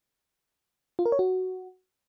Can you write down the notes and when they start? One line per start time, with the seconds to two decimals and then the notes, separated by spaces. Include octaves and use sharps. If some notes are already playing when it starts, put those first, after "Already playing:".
0.99 F4
1.06 A#4
1.12 C#5
1.19 F#4